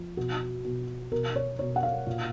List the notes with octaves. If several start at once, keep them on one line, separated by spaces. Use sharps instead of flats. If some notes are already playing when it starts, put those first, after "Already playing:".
Already playing: F3
B2 F#4
B2
B2 A#4
C#5
B2 C#5
F#5
F5
A#2